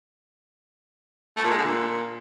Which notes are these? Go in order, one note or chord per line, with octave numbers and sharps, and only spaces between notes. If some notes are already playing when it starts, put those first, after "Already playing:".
A3
A#2
G#3
D3
A#2